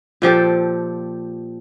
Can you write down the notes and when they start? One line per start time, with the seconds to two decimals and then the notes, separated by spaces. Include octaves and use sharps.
0.22 A#2 F3 G4 A4